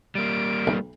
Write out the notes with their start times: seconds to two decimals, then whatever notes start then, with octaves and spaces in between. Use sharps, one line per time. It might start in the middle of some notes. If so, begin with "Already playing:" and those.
0.15 G3 A#3 D7
0.67 B1